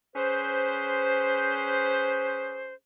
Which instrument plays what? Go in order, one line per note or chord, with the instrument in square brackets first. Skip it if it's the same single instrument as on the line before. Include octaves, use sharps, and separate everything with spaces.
[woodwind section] C#4 G#4 B4 C5